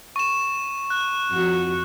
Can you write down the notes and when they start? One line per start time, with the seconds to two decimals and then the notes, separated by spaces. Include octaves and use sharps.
0.16 C#6 E7
0.90 F#6
1.32 F2 F#4